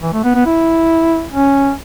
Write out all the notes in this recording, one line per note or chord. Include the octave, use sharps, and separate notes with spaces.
E3
A3
B3
B3
E4
C#4